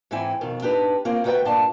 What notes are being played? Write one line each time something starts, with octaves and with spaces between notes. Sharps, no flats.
G#2 E3 C4 E4 G5 G#5
F2 B2 D#3
D4 D#4 G4 B4
A#3 C4 C#4 F4 A#4
D2 D#4 F#4 B4 E5 G5
G2 A#2 D4 D5 F5 A5